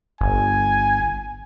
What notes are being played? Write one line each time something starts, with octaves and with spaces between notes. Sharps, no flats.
G1 G#5